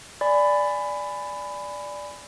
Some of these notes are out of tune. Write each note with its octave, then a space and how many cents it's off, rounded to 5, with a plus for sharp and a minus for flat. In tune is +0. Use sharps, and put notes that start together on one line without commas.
D5 +0 G#5 +0 B5 +15